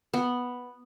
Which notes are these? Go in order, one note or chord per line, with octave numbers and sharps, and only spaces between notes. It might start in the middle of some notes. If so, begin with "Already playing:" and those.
B3